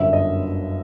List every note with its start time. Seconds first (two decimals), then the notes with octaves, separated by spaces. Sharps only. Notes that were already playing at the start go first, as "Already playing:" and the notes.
Already playing: G1 F#2 D3 E5
0.13 D#5